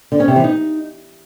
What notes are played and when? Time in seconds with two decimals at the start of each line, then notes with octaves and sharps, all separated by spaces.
0.12 D3
0.20 C#4
0.28 C3
0.36 E3
0.44 D#4